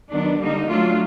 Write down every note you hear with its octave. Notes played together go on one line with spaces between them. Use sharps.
D#3 F#3 B3 D4
D3 G3 A#3 D#4
F#3 A3 D4 F4